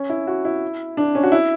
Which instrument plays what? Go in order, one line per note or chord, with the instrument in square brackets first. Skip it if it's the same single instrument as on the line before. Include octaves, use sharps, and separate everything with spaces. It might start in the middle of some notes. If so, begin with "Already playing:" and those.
Already playing: [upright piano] C#4
E4
F#4
E4
D4
C#4
F#4
E4